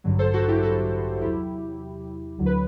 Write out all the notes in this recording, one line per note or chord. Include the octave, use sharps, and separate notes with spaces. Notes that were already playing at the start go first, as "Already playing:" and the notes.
A1 G2 D3 F#3
A4 C5
F#4 A4
E4 G4
F#4 A4
E2 C3 F#3 E4 G4
D2 D3 F#3
B4